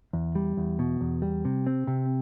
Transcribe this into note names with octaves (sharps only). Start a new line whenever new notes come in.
E2
G3
E2
B2
E2
G3
C3
C4
C3